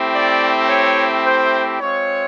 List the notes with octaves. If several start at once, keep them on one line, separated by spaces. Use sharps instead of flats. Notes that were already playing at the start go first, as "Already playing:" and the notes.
Already playing: A3 C4 E4 G4
D5
C#5
C5
G#3 C4 F4 C#5